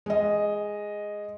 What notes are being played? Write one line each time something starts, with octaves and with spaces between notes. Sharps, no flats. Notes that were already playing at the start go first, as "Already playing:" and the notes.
G#3 D#5